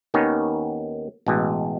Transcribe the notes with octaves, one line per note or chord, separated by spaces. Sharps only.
D#2 D#3 B3 C#4
A1 B2 G#3